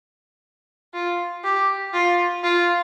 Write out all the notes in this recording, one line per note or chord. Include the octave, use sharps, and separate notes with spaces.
F4
G4
F4
F4